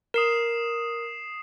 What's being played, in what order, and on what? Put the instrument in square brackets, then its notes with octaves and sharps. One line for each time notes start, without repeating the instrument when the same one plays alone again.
[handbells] A#4 [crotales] D#6 C7 E7